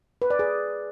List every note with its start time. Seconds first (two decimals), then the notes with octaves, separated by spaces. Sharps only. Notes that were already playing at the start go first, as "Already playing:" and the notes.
0.22 B4
0.30 D5
0.39 G#4